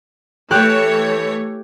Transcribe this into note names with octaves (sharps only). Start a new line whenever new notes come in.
E3 A3 G4 C#5 F#6